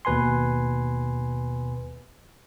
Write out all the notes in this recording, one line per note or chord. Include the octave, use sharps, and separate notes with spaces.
D#2 B2 B4 G#5 C6